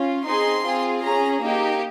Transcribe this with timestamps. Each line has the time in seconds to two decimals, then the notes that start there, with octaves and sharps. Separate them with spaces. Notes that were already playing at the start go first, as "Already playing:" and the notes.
Already playing: C#4 F4
0.26 C4 D#4 G#4 C6
0.65 C4 F4 G#4
1.04 C#4 G#4 A#5
1.42 A#3 D#4 G4